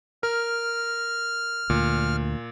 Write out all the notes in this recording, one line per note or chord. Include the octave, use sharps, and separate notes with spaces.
A#4 F6
D2 A#2